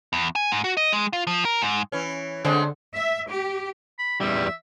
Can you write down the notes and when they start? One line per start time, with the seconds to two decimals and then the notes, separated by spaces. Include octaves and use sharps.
0.13 E2
0.35 G#5
0.52 G#2
0.64 F#4
0.77 D#5
0.93 G#3
1.13 F4
1.27 F3
1.45 A#4
1.62 G#2
1.92 E3 C#4
2.45 D3 G#3 A3 C4
2.94 E5
3.29 G4
3.99 B5
4.21 E2 G3 E5